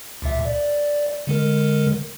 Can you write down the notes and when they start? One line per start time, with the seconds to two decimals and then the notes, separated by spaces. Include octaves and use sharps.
0.22 C#2 A#2 E5
0.45 D5
1.27 D3 G#3 A#4